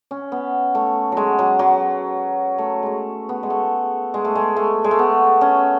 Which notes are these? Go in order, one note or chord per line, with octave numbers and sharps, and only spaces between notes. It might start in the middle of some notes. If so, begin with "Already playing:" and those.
C#4
B3
A3
F#3 G#3
F#3
F#3
A3
G#3 A3
B3
G#3
A3
G#3
A3
G#3
A3
G#3
A3
B3
C#4